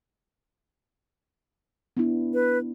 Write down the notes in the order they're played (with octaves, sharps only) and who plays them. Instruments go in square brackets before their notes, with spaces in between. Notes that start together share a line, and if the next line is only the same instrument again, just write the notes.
[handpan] B3 D4 E4
[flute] B4